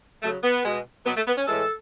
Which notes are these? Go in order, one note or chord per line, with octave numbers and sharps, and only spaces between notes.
C#3 F#3 A3
B3
B2 G#3
B2 F#3 B3
A3
B3
C#4
A2 E3 G#3 A4